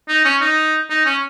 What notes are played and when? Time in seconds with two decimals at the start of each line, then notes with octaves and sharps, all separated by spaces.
0.08 D#4
0.25 C#4
0.41 D#4
0.90 D#4
1.05 C#4